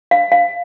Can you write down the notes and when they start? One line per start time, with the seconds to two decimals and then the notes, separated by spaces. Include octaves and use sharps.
0.11 F5
0.32 F5